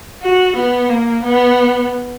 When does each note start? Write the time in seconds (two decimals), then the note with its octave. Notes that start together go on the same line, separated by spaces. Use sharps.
0.22 F#4
0.56 B3
0.90 A#3
1.24 B3